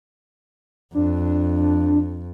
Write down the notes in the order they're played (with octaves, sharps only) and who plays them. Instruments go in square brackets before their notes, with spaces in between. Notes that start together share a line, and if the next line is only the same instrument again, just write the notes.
[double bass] F2 [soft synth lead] D4